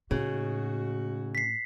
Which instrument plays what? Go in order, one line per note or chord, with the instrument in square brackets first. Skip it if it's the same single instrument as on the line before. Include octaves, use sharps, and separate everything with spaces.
[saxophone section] D#2 D#4 F#4 [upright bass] A2 [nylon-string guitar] C#3
[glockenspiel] B6 C7